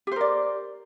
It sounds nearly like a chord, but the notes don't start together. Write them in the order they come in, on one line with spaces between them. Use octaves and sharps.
G4 C5 A#4 D5